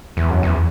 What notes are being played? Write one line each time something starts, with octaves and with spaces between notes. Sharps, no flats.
E2
F#2
E2